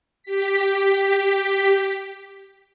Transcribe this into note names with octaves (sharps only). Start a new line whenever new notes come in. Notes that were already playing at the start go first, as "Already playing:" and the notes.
G4 B6